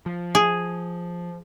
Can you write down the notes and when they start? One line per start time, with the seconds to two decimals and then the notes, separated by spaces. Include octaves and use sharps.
0.06 F3
0.35 G#4